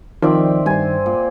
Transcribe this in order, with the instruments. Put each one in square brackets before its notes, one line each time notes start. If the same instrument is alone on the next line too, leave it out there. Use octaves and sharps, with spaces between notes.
[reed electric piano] D#3 [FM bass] F3 [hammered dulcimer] C4 D5 E5
[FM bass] G2 [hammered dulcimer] C5 G#5
[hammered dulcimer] A#2